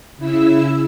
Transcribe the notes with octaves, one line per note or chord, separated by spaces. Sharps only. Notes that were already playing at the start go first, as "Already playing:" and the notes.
C#3 E4 E6